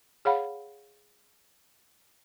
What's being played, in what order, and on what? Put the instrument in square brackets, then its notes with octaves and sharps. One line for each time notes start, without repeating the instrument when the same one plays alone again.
[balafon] G#4 C#5 F5 F#5 B5